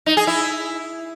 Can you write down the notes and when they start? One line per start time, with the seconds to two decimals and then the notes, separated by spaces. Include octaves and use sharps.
0.06 D#4
0.17 G#4
0.27 E4